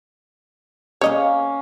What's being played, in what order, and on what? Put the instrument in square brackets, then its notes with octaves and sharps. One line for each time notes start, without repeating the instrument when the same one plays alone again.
[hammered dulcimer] A#3 C#4 [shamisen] C#5 D#5